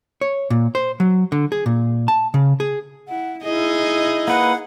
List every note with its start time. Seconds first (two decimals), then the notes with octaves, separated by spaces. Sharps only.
0.21 C#5
0.50 A#2
0.75 C5
1.00 F#3
1.32 D3
1.52 G#4
1.66 A#2
2.08 A5
2.34 C#3
2.60 G#4
3.08 E4 F#5
3.44 D#4 E4 G#4 D#5
4.28 A#3 B4 F#5